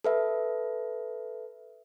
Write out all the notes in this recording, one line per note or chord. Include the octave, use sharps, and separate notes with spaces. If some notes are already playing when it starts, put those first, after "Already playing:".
A4 B4 E5